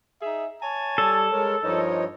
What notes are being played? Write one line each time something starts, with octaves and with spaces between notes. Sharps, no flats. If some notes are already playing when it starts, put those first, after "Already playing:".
D#4 G#4 E5
C#5 G#5 A5
G3 A4 D5
G#3 A#4 C#5
G2 F3 D#4 A#4 C#5 D#5